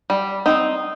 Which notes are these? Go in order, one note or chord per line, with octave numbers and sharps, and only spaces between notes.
G3
C4 D#4